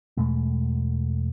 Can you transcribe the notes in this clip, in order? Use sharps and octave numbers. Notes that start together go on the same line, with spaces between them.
E2 B2 G#3 A3